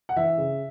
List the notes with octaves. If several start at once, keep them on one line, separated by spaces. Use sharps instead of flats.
F#5
E3 E5
C#3